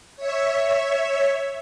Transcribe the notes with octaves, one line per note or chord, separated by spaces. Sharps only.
C#5 E5